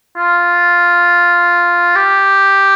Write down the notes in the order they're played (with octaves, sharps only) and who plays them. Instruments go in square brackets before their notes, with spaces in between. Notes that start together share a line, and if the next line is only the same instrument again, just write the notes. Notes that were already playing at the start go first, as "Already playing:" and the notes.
[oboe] F4
G4